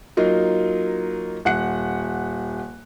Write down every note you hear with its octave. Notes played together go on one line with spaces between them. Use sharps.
F#3 A#3 D#4 F4
D#1 F#5 F#6 C#7